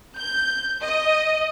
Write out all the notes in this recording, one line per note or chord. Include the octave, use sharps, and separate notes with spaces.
G6
D#5